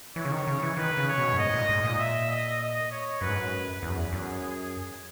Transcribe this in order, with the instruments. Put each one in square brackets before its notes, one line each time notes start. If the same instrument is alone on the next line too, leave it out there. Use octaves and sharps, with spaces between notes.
[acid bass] E3 [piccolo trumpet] C#5
[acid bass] C#3
D#3
C#3
E3
[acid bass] D#3 [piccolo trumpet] B4
[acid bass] C#3
[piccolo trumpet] C#5
[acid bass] B2
F#2
[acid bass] G#2 [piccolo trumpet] D#5
[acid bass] A#2
G#2
A#2
[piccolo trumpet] E5
D#5
D#5
C#5
[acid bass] F#2 [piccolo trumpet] B4
[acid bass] G#2
F#2
[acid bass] E2 [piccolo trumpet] G#4
[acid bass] F#2
E2
F#2